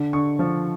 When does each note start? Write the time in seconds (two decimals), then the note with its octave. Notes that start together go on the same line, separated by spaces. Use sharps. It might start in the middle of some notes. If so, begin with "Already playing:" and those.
Already playing: D3
0.13 D3 C#6
0.39 F3